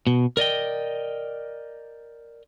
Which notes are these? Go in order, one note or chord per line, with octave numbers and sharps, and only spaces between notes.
B2
A#4 D5 D#5 G5